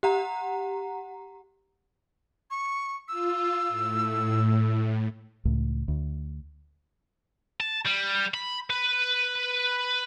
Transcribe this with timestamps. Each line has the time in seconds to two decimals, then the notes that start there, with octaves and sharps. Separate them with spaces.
0.03 G4 F#5 A#5
2.50 C#6
3.08 F4 E6
3.69 A2
5.45 C#2 A2
5.88 D2
7.60 A5
7.85 G3
8.34 B5
8.70 B4